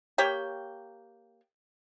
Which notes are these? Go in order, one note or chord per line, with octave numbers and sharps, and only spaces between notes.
A#3 G4 C#5 G5